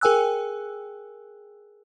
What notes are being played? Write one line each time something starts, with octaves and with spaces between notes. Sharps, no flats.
G#4 A#4 G5 G#5 E6 F#6